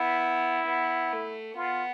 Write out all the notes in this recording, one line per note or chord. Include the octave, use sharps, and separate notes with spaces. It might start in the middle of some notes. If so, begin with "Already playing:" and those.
Already playing: B3 E4
B3
A3
B3 F4